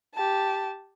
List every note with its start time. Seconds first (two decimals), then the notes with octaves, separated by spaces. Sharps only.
0.14 G4 A5